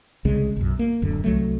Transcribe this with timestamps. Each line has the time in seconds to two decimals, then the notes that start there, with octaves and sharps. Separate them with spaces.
0.25 C2 C#3 G#3
0.57 B1 F#2
0.79 A#3
1.02 D1 F#2 D3
1.24 C2 F#3 A3